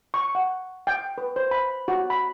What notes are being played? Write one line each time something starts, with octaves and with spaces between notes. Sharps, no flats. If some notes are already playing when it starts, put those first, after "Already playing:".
C#6
F#5
G5
B4
C5
B5
F#4
B5